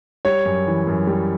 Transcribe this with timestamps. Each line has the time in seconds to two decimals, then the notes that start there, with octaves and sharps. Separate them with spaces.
0.25 G3 C#5
0.46 F#2
0.67 E3
0.87 F#2
1.07 G3